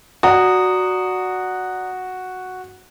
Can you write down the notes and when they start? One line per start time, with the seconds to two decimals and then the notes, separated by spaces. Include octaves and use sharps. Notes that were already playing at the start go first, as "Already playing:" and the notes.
0.23 F#4 D5 A#5 D#6